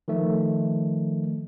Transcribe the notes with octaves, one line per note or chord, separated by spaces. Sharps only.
D#3 F3 A3